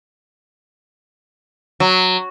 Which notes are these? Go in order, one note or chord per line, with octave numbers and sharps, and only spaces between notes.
F#3